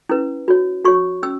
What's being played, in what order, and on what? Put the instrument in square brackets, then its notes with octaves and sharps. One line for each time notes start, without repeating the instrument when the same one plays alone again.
[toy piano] C#4 E4 B4
F#4 C#5
F#4 C#5 C#6
C#4 E6